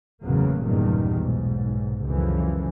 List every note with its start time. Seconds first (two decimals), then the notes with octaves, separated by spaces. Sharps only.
0.25 F#1 E2 A2 C#3 F#3 A#3
0.64 F#1 E2 G2 A#2 D#3 G3
1.17 B1 G#2
2.06 C#2 F#2 D3 E3 F3